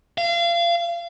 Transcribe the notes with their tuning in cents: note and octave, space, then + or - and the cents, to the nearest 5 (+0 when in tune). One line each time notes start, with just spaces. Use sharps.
F5 -30